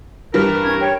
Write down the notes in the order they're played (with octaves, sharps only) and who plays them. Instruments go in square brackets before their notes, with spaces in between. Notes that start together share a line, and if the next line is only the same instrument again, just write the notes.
[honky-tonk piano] G2 E3 G3 [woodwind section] A#4
[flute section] C#4 G#6
C#5 G5